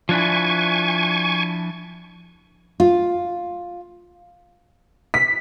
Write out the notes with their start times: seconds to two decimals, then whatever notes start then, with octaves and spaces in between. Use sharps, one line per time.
0.09 F3 D4 E4 G#5 C#6
2.80 F4
5.14 B6